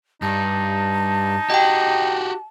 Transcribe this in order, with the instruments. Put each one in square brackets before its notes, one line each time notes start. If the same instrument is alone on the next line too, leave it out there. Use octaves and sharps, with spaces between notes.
[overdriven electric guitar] G2 [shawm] D#4 [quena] A5
[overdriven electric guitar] F#4 G4 [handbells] D#5 G5